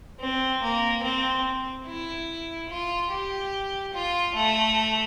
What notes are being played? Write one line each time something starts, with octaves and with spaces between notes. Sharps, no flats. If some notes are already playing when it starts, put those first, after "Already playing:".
C4
A#3
C4
E4
F4
G4
F4
A3